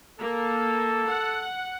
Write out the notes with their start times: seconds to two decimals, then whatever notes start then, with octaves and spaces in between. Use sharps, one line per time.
0.19 A#3 A4
1.09 F#5